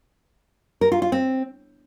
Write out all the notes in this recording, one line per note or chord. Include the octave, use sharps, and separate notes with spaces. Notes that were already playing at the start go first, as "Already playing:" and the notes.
A#4
F4
F4
C4